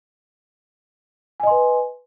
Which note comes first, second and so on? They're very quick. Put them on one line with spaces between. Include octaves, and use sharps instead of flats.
G#5 D#5 C6 B4